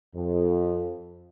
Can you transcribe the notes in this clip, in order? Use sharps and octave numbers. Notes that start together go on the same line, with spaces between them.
F2